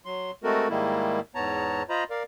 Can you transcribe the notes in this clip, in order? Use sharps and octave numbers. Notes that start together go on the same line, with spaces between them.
F#3 C6
G#3 A3 C4 F#4 A4 A#4
G#2 D#3 G3 G#3 A#3 E4
E2 G#2 B3 C#5 A5 A#5
F4 C5 D#5 A#5 B5
A#4 D5 F5